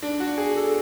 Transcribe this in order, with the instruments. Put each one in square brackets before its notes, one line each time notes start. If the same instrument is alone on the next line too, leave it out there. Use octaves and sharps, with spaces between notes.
[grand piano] D4
F#4
G#4
A4